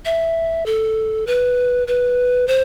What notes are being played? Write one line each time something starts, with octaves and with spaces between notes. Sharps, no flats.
E5
A4
B4
B4
C5